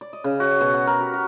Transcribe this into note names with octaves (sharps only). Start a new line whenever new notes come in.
D5
D#5
C#3
F#4
B2
F#5
A#4
G4
F#4